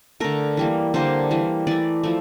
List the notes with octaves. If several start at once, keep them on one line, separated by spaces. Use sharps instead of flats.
D3 A3 A#4
E3 G3 A#3
D3 G3 A#3 C5
E3 G3 A#3
E3 A3 D5
F3 A3